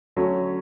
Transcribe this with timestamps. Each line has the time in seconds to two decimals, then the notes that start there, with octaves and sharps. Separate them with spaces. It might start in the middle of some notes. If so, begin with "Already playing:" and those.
0.16 D3 F#3 A3 C#4